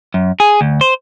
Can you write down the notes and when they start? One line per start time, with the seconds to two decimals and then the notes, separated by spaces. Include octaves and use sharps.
0.14 F#2
0.40 G#4
0.61 D2
0.81 C5